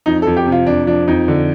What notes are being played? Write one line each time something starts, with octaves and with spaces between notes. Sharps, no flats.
F2 D#4
F2 A4
G4
C3
F4
F2 D4
F3 D4
F2 D#4
D3